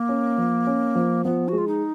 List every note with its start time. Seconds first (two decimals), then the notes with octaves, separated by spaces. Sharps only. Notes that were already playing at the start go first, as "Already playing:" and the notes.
Already playing: A#3
0.09 C#4
0.38 F3
0.67 C#4
0.95 F3
1.24 F3 B3
1.48 G#3 F#4
1.58 F4
1.68 D#4